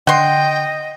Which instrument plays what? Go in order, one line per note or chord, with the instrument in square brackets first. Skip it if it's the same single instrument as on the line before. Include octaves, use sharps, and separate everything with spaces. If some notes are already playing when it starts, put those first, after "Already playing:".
[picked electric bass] D3 [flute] D#5 [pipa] F#5 C6 [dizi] G5